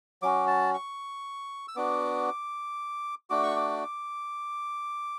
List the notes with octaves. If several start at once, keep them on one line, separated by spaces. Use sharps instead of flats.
F#3 C#4 F#4 D6
A5
C#6
E6
B3 D4 F#4 D6
A3 D4 F#4 D6
C#6
D6